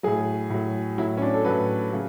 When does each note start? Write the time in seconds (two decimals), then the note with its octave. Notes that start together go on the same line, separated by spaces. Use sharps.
0.03 A2 F#3 G#4
0.50 A2 F#3
0.98 F#3 E4
1.01 A2
1.17 C#4
1.22 D4
1.34 A4
1.45 A2 F#3 B4
1.92 C#3 F#3